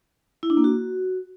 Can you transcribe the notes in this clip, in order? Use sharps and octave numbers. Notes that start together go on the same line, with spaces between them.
E4
D4
A#3
F#4